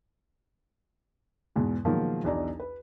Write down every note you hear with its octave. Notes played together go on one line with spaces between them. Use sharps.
E2 G#2 B2
B2 D#3 F3 F#3 G#3 A#3
B1 E2 D4 D#4 D5 A#5
B4